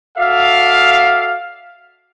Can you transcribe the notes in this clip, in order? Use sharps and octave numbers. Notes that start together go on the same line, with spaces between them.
F#4 A4 D5 E5 F5